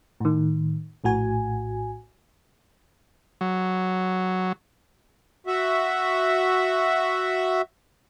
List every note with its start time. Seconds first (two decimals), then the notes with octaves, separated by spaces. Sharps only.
0.20 A2 D#3
1.04 A#1 A2 F#4 G#5
3.41 F#3
5.47 F#4 E5